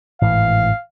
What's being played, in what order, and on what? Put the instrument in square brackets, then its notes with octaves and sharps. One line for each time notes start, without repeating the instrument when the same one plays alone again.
[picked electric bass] G#1 A2 E3 [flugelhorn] F5